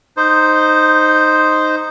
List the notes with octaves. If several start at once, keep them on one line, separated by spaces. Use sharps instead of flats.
D#4 C5